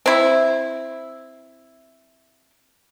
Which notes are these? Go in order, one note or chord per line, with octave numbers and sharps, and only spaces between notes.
C4 E4